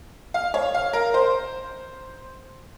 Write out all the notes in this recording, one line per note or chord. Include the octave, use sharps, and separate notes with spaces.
F5
C#5
F5
A#4
C5